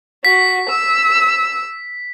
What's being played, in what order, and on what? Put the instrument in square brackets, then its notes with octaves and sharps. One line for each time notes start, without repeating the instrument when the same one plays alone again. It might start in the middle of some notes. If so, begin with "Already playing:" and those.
[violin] F#4 [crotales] B6
[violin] E6